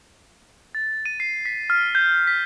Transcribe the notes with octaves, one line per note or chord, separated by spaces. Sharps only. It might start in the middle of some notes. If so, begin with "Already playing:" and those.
A6
D#7
C7
B6
F6
G6
B6